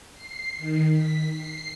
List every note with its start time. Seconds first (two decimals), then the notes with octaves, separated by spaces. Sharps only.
0.14 C7
0.58 D#3
0.91 B6
1.31 C7